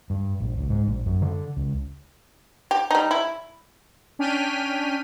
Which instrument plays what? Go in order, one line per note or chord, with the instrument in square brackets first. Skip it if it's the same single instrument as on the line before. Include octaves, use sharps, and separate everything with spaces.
[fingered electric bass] G2
A#1
C#2
G#2
A#1
F#2
D3
C#2
[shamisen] G4
G3 D#4
E4
[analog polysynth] C#4 D4 G5 F6 B6 D#7